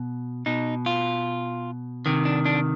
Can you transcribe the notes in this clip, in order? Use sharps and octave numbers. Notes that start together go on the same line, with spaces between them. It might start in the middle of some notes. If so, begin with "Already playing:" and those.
Already playing: B2
B2 D#4
F4
C3 D#3
D4
D4